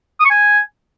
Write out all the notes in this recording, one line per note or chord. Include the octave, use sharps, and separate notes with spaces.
D#6
C#6
G#5